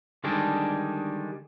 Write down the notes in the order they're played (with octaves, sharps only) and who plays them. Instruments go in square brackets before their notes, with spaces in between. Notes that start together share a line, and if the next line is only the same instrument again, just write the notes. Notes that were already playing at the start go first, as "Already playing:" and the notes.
[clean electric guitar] D3 D#3 G3 G#3 D4